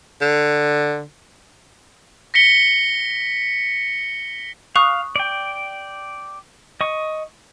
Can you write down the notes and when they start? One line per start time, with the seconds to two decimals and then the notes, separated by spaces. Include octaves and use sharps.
0.21 D3
2.34 A#6 B6 C#7 G7
4.76 F5 C#6 D#6 F#6
5.16 D5 G5
6.81 D#5 C#6